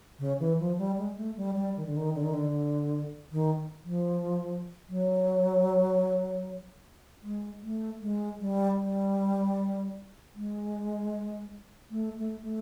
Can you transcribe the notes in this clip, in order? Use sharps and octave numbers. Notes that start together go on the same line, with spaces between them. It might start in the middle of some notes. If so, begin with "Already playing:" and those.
C#3
E3
F3
G3
G#3
A3
G3
G3
D#3
D3
D#3
D3
D#3
D3
D#3
F3
F#3
G#3
A3
G#3
G3
G3
G#3
A3
A3
A3